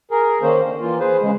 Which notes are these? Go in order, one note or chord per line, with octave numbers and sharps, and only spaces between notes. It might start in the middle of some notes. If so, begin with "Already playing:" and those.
G#4 A#4
D#3 A#3 C#4 C5
D3
E3 A#3 F4
G#4 B4 C5
C#3 G#3